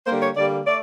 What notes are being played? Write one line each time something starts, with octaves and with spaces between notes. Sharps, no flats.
D3 G3 A#3 C5
C#5
D3 G3 A#3 D5
A3 D5